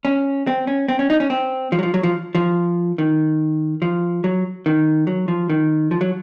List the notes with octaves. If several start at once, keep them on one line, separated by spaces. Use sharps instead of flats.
C#4
C4
C#4
C4
C#4
D#4
C#4
C4
F3
F#3
F3
F#3
F3
F3
D#3
F3
F#3
D#3
F#3
F3
D#3
F3
F#3